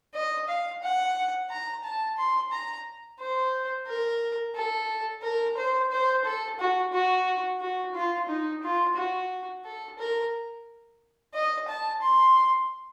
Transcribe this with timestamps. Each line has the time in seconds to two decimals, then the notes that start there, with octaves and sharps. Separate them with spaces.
0.14 D#5
0.48 F5
0.83 F#5
1.50 A#5
1.84 A5
2.18 C6
2.52 A#5
3.20 C5
3.87 A#4
4.55 A4
5.23 A#4
5.58 C5
5.92 C5
6.25 A4
6.60 F#4
6.93 F#4
7.61 F#4
7.95 F4
8.29 D#4
8.63 F4
8.97 F#4
9.65 A4
9.99 A#4
11.34 D#5
11.68 A5
12.02 C6